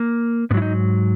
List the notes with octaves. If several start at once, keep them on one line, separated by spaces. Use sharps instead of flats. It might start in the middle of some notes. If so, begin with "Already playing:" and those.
Already playing: A#3
G#2 F#3 B3 E4
D#4